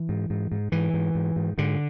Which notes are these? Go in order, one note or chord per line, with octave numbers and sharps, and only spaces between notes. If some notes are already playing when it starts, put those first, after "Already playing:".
Already playing: E3
G#2
G#2
G#2
G#2 E3
G#2
G#2
G#2
G#2 D3